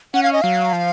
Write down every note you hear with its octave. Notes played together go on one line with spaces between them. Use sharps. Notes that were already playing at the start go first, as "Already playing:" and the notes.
C#4 F#5
F5
D#5
F#3 F5
F3